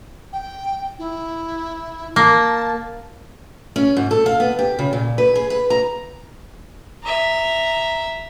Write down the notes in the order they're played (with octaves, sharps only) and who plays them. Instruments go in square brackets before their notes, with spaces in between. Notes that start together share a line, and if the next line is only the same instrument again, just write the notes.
[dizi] G5
E4
[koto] A#3 [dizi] A5
[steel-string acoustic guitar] C#4
G#2
A4
F5
B3
G4
C#3
A#2
B4
G#4
B4
A#5
[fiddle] E5 A#5